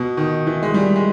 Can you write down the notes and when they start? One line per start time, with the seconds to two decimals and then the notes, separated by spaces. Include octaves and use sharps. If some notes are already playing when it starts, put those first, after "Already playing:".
Already playing: B2
0.17 D#3
0.47 E3
0.63 G#3
0.74 G3
0.96 G#3